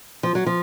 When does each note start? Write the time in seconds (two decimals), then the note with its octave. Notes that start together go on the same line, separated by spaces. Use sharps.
0.23 F3
0.35 F#3
0.46 F3